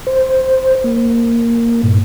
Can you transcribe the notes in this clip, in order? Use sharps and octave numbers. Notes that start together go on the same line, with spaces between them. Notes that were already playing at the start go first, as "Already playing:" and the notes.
C5
A#3
G2 A#2